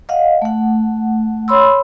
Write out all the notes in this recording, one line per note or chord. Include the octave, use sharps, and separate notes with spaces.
D#5 F5 F#5
A3 F#5
C#5 B5 C6 E6